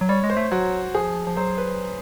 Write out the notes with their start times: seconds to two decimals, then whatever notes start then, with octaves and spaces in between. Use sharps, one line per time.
0.01 F#3
0.09 G3 C#5
0.24 G#3
0.30 C5
0.37 A3
0.51 F#3 F#4
0.94 F3 G#4
1.27 F3
1.37 F#3 C5
1.58 B4